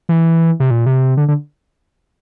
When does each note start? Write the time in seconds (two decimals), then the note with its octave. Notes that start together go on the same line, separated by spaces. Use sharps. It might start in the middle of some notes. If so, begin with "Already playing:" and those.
0.09 E3
0.60 C3
0.71 A#2
0.86 C3
1.17 D3
1.28 D3